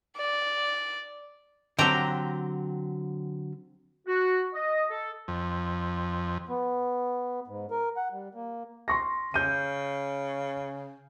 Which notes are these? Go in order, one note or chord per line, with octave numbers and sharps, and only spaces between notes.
D5
D3 F#3 C4 G4 A#5
F#4
D#5
A4
F2
B3
G#2
A#4
F#5
G3
A#3
C6 C#6 A#6
C#3 G6 D#7